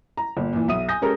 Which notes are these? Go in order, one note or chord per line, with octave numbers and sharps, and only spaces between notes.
A#5
G1 A#2
A#2 E3
B1 E5 D#6 D#7
G#5 D#6 G6 A#6
G#3 C#4 G4 A4 A#4 A#5